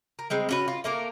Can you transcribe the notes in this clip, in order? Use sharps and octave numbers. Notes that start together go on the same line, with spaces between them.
A#4
G3 G#3 C4
C#4 F#4 B4
F4
A3 A#3 A#4